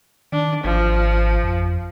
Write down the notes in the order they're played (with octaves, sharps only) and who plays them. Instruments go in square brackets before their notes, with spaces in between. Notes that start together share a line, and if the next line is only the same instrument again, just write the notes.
[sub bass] D#3 [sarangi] D4
[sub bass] G#1 [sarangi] F3
[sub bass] F2